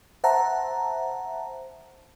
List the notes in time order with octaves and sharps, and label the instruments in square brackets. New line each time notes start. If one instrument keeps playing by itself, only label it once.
[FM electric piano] C5 E5 F#5 A5 A#5